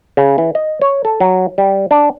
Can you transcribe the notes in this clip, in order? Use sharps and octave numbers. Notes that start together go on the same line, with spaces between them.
C#3
E3
D#5
C#5
A4
F#3
G3
D4